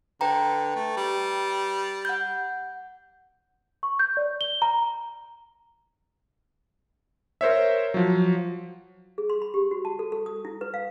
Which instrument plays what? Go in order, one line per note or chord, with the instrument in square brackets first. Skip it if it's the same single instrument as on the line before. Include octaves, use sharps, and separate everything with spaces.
[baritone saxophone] D3 [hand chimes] B4 G5 A#5
[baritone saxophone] A3
G3
[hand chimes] F#5 G6
[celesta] C#6
G6
D5
G7
A#5
[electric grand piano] A#4 C5 C#5 E5
F3 F#3
[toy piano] G#4
C6
B5
G4
F#4
A5
A4
A4
D#6
E4
B4
F5